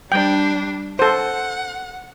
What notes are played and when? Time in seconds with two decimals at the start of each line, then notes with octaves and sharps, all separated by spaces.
0.12 G3 D4 G5
0.99 A4 C5 F#5